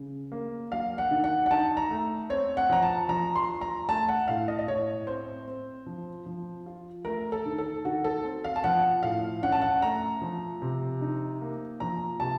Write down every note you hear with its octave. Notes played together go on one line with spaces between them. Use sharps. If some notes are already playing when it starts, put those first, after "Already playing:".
Already playing: C#3
A#3
F#3 F5
F#5
D#3
F#5
F#5
D#4 A5
A#5
A3
C4 C#5
F#5
F3 A#5
A5
F3 A#5
C6
F4
A#5
A3 A5
F#5
A2 F5
D#5
D#5
A2 C#5
C4 C5
C4
F3
F3
F4
A3 A#4
A4
D#3
A4
D#3 F#4
A4
C4
F5
A5
F3 F#5
A2 F5
C#4 F#5
A5
F#5
A3 A#5
F3
C3
D#4
A#3
F3 A#5
C3 A5